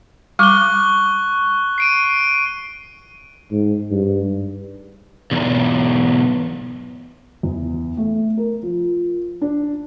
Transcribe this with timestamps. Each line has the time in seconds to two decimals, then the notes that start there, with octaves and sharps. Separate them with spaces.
0.39 G3 C#6 D6 F#6 G7
1.78 C7 D7 D#7
3.52 G#2
3.91 G2
5.31 B1 E2
7.43 E2
7.97 A3
8.37 A#4
8.63 F3
9.41 D4